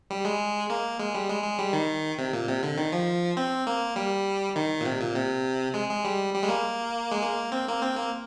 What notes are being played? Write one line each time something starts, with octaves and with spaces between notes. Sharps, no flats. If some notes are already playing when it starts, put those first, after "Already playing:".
G3
G#3
A#3
G#3
G3
G#3
G#3
G3
D#3
C3
A#2
C3
D3
D#3
F3
C4
A#3
G3
D#3
A#2
C3
A#2
C3
G#3
G#3
G3
G3
G#3
A#3
G#3
A#3
C4
A#3
C4
A#3